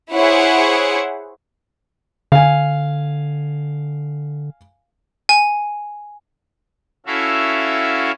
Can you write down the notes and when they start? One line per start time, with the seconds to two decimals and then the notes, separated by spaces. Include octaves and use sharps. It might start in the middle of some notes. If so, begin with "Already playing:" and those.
0.14 E4 G#4 C5 C#5 F#5
2.32 D3 F5 G#5
5.29 G#5
7.06 C#4 E4 F#4 A4 E5 F5